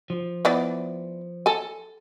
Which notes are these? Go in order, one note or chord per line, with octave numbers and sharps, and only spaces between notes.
F3
E3 B3 D5
A4 G#5